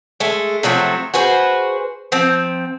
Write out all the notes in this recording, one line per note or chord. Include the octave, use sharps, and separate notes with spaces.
G#3 A3
C3 F3 F#3 A3
F#4 G#4 B4 C5
F3 C4